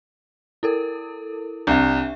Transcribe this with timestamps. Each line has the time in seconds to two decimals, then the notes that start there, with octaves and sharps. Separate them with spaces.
0.63 E4 A4 A#4
1.67 C2 D4 E5